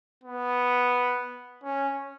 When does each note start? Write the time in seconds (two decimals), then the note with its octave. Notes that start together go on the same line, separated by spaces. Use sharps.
0.24 B3
1.64 C#4